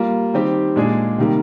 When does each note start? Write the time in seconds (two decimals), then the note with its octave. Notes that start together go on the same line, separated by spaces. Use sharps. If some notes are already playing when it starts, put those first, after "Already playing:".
Already playing: G3 A#3 F4
0.34 D#3 G3 C4 G4
0.76 A#2 G#3 D4 G#4
1.18 C3 D#3 G3 A#3